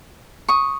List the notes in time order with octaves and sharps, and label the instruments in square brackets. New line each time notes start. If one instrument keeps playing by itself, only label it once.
[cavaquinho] C#6 D#6